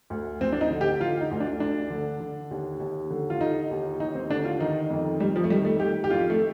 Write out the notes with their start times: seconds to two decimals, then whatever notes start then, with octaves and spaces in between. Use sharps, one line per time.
0.10 D2
0.40 D2 C4
0.52 D4
0.61 D#4
0.71 D3
0.81 G4
1.00 D3 F4
1.21 D#4
1.31 D2
1.40 D4
1.60 D2 D4
1.90 D3
2.20 D3
2.51 D#2
2.80 D#2
3.10 D3
3.30 F4
3.41 D3 D#4
3.71 D#2
4.00 D#2 D#4
4.15 C4
4.30 D3 D4
4.45 F4
4.60 D#3 D#4
4.90 F2
5.20 F2 G3
5.36 F3
5.44 A3
5.50 D#3 G3
5.65 A3
5.80 D#3 G4
6.04 G4
6.10 F2 F4
6.30 A3